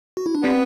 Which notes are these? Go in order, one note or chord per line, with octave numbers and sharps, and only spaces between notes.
F#4
E4
D4
D3 G3 B3 C4